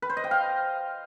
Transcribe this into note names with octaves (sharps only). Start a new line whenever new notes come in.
B4
C5
D#5
G5
F5